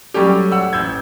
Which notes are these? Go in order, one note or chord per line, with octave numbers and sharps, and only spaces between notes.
F#3 G3 A3 C#4 G4
F#5 E6
A1 E6 G6 G#6